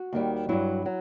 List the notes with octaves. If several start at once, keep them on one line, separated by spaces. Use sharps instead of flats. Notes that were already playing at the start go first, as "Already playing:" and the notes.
Already playing: F#4
D#2 D#3 G3
G2 F#3 E4
F#3